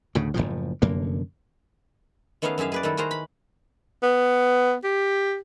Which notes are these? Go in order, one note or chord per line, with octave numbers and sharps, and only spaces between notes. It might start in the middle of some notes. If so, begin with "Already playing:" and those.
D2 A2 C#3
F#1 C#2 A2 F3
F1 F#2 D3 A#3
D#3 A3 B3 C#4 G#4 F5
F#2 E4 G#4 E5 F5
G#4 B4 D5
D#3 G3 E4 F#4 A4
F#4 G#4 A#4 C5 A#5
B5
B3
G4